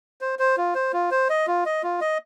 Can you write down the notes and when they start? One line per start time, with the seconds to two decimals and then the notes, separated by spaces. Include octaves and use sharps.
0.21 C5
0.39 C5
0.57 F4
0.75 C5
0.93 F4
1.11 C5
1.29 D#5
1.47 F4
1.65 D#5
1.83 F4
2.01 D#5